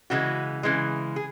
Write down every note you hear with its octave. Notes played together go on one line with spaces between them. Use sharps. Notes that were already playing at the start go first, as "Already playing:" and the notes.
C#3 E3 G#3 F#4
C#3 E3 G#3
G#4